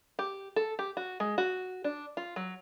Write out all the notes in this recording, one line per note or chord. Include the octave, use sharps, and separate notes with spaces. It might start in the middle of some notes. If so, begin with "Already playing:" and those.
G4
A4
G4
F#4
G#3
F#4
D4
F4
F#3